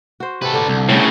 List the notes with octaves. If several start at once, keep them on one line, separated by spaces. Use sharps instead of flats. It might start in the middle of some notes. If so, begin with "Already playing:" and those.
F#4 C5
C3 F#4 A4 B4
D3 D4
C2 A4
A2 C#3 A3